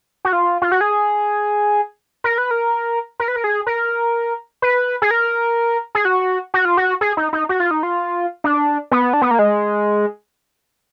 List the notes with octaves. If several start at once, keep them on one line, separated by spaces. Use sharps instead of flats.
F#4
F4
F4
F#4
G#4
A#4
B4
A#4
A#4
B4
A#4
G#4
A#4
B4
G#4
A#4
G#4
F#4
F#4
F4
F#4
G#4
D#4
D#4
F#4
F4
D#4
F4
D4
B3
D4
B3
A#3
G#3